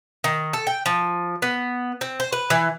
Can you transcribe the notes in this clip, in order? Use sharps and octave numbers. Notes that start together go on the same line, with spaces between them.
D#3
A4
G5
F3
B3
C4
C5
B4
E3